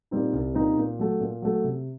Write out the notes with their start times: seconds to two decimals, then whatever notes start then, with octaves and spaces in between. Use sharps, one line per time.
0.11 A#2 G3 C4 D#4
0.33 C2
0.54 A#2 G3 C4 D#4
0.77 A#2
0.99 F#3 A3
1.21 A#2
1.42 F#3 A3
1.64 C3